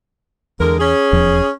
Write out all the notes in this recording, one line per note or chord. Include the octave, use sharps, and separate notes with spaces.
E2 D3 G#3 A#4
C#4 G#4
D#1 E2 F3